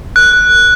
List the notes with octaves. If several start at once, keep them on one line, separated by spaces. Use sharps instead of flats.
F#6